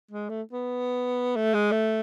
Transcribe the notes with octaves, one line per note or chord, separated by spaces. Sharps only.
G#3
A3
B3
A3
G#3
A3